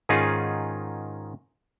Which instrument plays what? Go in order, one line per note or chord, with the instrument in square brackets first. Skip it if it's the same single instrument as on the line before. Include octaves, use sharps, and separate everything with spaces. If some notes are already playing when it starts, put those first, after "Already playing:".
[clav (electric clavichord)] G#2 D#3 C#4 D#4 F4 G#4